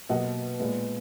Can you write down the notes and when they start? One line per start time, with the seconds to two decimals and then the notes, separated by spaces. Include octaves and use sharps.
0.09 B2 F#3 A#3 D#5 F#5
0.60 A#2 G#3 B3